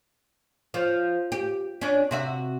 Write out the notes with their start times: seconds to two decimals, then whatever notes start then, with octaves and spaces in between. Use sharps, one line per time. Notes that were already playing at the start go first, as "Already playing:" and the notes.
0.74 F3
1.32 G4
1.81 C#4 D4
2.11 C3 F#4 E5